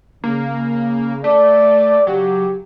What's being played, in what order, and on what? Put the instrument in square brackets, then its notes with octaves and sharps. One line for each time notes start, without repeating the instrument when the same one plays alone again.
[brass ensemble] C#3 [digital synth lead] A#3
[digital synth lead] A3 [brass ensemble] D5
[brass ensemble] C#3 G4 [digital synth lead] F#3